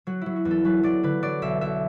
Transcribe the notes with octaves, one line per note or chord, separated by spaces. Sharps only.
F#3 F#4
F#3 E4
F#4
E2
A4
F#3 B4
F#3 D5
D3 B4
F#3 D5
B1 E5
B1 E5